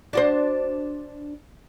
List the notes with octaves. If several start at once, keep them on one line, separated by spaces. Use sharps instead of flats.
D4 F#4 C5